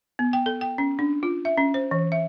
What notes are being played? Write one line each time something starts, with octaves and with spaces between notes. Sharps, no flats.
B3
G5
A4
G5
C#4
D4
F4
E5
C#4
C5
E3
E5